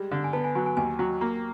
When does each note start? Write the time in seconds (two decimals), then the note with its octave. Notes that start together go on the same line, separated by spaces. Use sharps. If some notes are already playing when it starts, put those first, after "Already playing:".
Already playing: G3 G#3
0.11 D3
0.24 G#5
0.33 B3 A5
0.44 G#5
0.55 F#3 G#5
0.66 G#5
0.77 D#2 G#5
0.99 F#3
1.21 A#3